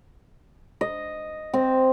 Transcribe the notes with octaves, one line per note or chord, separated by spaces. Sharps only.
D#5
C4